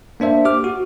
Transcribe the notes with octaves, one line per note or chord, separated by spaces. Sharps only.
A#3 D4 C5 E5
G4 D6 F6
F#4